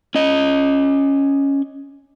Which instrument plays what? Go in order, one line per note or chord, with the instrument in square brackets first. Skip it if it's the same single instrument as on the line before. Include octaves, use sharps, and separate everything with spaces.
[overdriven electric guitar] C#4 D#5